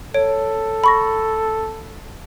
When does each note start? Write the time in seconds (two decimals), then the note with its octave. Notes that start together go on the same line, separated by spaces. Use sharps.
0.14 A4 C#5 D7
0.84 B5 C#6 A#6